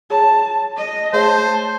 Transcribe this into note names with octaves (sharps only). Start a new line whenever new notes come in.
G#4 C#5 A5 A#5
D#5
A3 G#4 C5 C#5 A5